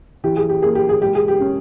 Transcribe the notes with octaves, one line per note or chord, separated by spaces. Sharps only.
E3 G4
G#4
G4
A#3 G#4
G4
G#4
G#3 G4
G#4
G4
C#4